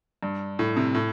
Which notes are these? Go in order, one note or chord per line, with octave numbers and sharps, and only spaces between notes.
G2
A2
C3
A2